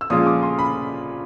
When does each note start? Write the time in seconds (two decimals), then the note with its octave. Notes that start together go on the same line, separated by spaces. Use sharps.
0.01 E6
0.10 A#2 F3 G#3 C#4 F4 D#6
0.27 D6
0.42 C6
0.59 B5